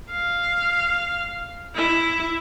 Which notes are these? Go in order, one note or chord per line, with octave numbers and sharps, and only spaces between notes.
F5
E4